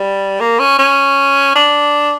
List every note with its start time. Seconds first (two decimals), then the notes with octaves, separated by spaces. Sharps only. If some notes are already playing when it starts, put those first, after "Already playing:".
Already playing: G3
0.40 A#3
0.59 C#4
0.79 C#4
1.56 D4